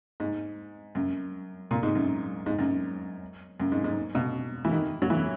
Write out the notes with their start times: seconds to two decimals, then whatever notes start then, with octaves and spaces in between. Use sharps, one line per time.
0.20 G#2
0.95 F#2
1.71 A#2
1.83 G#2
1.95 F#2
2.46 G#2
2.59 F#2
3.60 F#2
3.72 G#2
3.84 G#2
4.15 B2
4.65 E3
4.72 D#3
5.02 F#3
5.10 E3